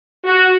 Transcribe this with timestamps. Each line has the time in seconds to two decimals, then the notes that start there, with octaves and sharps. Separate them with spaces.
0.24 F#4